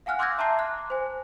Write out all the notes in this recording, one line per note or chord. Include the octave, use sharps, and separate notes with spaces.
F5 F#5 G#5 F6 F#6
C6 D6 E6 G6 G#6 A#6
E5 A5 A#5 C6 D6 C7
F#6
C5 G#5